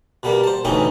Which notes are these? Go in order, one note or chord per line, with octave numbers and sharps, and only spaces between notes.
B2 G3 A#3
C5 A5
D2 B2 E3 C#4 D#4 G5